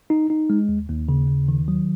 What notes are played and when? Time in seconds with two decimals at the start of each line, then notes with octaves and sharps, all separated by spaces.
0.10 D#4
0.30 D#4
0.50 G#3
0.69 D#2
0.89 D#2
1.09 C#3
1.28 D#2
1.48 D#3
1.68 F#3